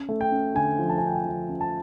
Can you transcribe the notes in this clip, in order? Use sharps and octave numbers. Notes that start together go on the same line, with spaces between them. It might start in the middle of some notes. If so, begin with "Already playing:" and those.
Already playing: C#4
A3
G5
C#4
D3 G#5
F3
A5
D3 G#5
G5
G#5
F3
C#4
A5